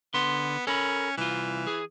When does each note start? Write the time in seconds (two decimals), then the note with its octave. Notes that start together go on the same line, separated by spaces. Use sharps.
0.14 D3 B3 C6
0.67 C#4 A4 A#4 B5
1.18 C2 E3 F4
1.67 G#4